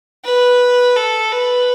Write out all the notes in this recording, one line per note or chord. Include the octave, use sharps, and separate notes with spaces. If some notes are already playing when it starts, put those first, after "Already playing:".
B4
A4
B4